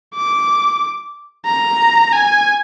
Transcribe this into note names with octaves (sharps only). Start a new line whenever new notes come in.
D6
A#5
G#5